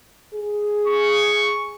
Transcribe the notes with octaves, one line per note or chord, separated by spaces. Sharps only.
G#4
C#6